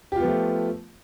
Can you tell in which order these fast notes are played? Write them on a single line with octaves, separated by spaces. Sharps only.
G4 F4 B3 F3 A3